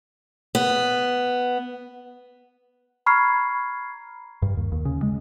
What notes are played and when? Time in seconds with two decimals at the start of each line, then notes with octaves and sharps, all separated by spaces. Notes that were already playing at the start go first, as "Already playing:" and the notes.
0.55 B3
3.06 A#5 B5 C#6 F6 G#6 C7
4.42 G2
4.57 D#2
4.72 D#2
4.85 C#3
5.03 G#3